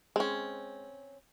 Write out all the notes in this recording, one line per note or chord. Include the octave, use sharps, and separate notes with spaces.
G#3 C4 C#4